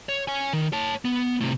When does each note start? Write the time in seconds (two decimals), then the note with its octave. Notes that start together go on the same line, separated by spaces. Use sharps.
0.09 C#5
0.28 C#5 G#5
0.53 D#3
0.73 C#5 A5
1.05 B3
1.40 A2 C3